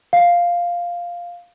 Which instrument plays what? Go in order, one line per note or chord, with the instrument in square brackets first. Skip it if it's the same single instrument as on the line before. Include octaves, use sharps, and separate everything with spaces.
[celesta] F5